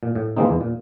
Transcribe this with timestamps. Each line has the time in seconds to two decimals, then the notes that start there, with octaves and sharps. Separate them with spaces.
0.03 A#2
0.15 A2
0.37 E3 F3 G#3 A#3 C4 D#4
0.49 E2
0.61 A#2